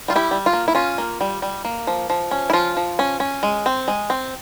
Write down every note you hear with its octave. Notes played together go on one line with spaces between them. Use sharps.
G3 F4
E4 G4
G3
F4
A#3
E4
C#4 F4
A#3
G3
G3
A#3
F3
F3
C#4
E4
F3 F4
F3
C#4
C#4
G#3
C4
G#3
C4